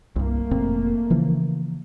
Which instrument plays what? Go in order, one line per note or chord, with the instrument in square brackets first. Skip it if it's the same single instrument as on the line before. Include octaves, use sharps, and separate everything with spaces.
[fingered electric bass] C2 G2 [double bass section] A3 A#3
[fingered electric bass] F1 A#2 C4
C#3 E3 F3